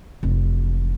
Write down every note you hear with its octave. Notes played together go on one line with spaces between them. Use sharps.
F1 E3